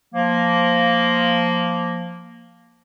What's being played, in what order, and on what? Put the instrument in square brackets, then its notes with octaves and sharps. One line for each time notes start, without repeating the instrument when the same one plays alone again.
[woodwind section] F3 A#3